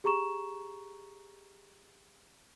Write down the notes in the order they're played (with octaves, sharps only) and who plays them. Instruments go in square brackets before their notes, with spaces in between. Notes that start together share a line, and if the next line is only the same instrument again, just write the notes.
[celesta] G4 G#4 A#5 C#6 E7